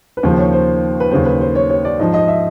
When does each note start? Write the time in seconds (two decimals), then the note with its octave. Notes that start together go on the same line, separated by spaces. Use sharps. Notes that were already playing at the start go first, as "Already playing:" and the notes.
0.17 B4
0.23 D#2 C#3 F3 C5
0.38 C#5
0.53 C5
1.00 B4
1.11 D#2 C#3 F#3 C5
1.26 B4
1.41 C5
1.55 C#5
1.70 C#5
1.85 D5
1.99 G#2 F3 D#5
2.14 D#5
2.28 E5